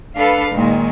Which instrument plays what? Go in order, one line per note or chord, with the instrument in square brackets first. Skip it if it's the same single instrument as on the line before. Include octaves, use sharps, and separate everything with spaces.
[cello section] D4 A4 B4 F5
A#2 D#3 G#3